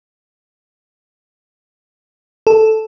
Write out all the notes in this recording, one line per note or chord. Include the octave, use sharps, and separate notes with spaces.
A4